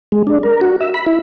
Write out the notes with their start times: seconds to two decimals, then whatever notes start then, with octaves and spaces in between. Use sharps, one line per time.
0.12 G#3
0.27 D4
0.43 A#4
0.61 F#4
0.81 E5
0.94 B5
1.06 E4